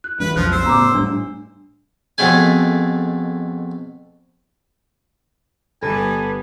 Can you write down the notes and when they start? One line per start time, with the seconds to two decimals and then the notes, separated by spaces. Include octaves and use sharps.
0.04 F#6
0.20 E3 G#3 D4 B4
0.36 B1 F2 F3 F#6
0.52 C5 E6
0.66 A2 C#3 B3 A#5 D6
0.95 A2 G3 D4
2.18 F2 B2 G#3 A3 G#5
5.83 G1 G3 B3 A4 B4 G#5 D#7 E7